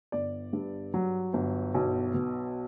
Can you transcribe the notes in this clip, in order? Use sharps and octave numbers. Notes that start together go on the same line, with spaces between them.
G1 D5
G2
F#3
G1
B1
B2